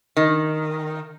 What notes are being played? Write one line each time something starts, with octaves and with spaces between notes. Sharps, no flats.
D#3